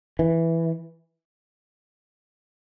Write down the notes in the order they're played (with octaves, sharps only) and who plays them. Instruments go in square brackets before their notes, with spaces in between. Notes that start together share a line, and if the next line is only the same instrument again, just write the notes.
[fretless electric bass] E3